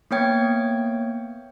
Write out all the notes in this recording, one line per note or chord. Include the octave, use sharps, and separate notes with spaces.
A#3 B3 C#5 G5 G#6